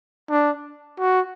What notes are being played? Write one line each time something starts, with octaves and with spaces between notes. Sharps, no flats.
D4
F#4